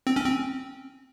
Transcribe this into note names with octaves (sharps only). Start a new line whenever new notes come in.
C4
C#4
C4